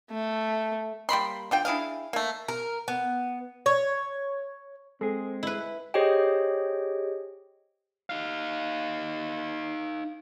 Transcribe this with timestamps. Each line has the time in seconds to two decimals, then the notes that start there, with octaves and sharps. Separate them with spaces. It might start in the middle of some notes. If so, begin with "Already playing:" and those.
0.10 A3
1.09 G3 A#3 B5 C6
1.51 D3 F4 G5
1.65 D4 E4 G#4 F5
2.13 A3 A#3
2.48 A#4
2.88 B3
3.66 C#5
5.01 G#3 C4 G#4 A4
5.43 E4 B4
5.94 G4 G#4 C5 C#5 D#5 G5
8.10 D#4 F5